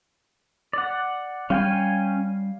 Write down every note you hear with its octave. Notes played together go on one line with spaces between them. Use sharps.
D5 F#5
G3 C#4 F5 G5 G#5